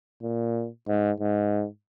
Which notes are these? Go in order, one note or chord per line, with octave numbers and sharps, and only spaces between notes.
A#2
G#2
G#2